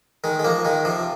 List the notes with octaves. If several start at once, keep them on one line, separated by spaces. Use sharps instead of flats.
D#3 G#3
G#3
F3 A#3
D#3 G#3
C3 F3